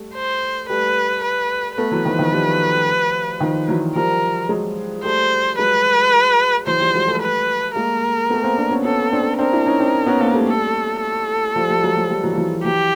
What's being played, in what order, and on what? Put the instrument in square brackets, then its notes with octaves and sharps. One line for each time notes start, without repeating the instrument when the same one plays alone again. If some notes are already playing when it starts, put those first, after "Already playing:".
Already playing: [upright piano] G3 A3
[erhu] C5
[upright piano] G3 A3 [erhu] B4
[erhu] B4
[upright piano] A3 B3 [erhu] B4
[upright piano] E3 F#3
D#3 F3
D#3 F3
F3 G3
D#3 F3
E3 F#3
[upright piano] F3 G3 [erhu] A#4
[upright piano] F#3 G#3
[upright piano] G3 A3 [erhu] C5
[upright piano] F#3 G#3 [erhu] B4
[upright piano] E3 F#3 [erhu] C5
[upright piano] F3 G3
F#3 G#3
G3 A3
[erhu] B4
[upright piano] G#3 A#3 [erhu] A#4
[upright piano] A3 B3
A#3 C4
C4 D4
B3 C#4
[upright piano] B3 C#4 [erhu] A4
[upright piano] C4 D4
[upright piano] C4 D4 [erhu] A#4
[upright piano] D4 E4
C#4 D#4
C4 D4
B3 C#4
A#3 C4
G3 A3
[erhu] A4
A4
[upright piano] F3 G3
F3 G3
F#3 G#3
F3 G3
F3 G3
E3 F#3
F3
E3 F#3
[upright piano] E3 F#3 [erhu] G4